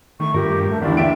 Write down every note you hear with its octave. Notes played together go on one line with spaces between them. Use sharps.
D#3 A3 C#6
G2 A#2 G4 A#4
A3
G1 D#2 E3 D4 D5
G4 E5 D7